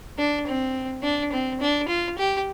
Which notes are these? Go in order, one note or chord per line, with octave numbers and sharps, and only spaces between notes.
D4
C4
D4
C4
D4
F4
G4